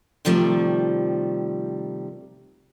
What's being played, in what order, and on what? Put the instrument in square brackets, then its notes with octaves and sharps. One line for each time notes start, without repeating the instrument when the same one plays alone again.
[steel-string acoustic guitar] C3 D#3 F3 G3 A3